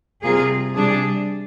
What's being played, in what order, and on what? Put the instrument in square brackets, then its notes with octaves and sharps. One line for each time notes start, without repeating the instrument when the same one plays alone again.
[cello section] C3 G3 A#3 F4 G#4
C3 G3 D4 G#4